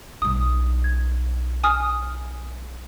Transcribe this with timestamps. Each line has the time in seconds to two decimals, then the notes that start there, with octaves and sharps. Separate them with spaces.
0.22 B1 G3 D#6
0.84 G#6
1.64 G#5 D#6 F6